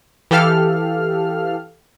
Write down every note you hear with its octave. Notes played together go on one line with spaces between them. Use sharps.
E3 G4 A4 F5 F6